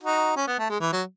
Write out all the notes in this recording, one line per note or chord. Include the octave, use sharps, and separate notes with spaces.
D#4 F#4
C#4
B3
A3
G#3
E3
F#3